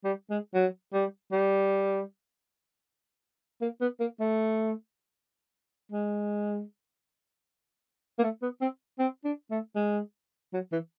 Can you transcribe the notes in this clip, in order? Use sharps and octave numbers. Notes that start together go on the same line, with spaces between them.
G3
G#3
F#3
G3
G3
A#3
B3
A#3
A3
G#3
A#3
A3
B3
C4
C4
D4
A3
G#3
F#3
E3